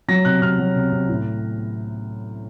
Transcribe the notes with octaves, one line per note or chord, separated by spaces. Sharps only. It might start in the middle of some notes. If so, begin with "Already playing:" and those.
F#3 A#6
C3 F#6
C3 F6
F#3
C3
C3
A2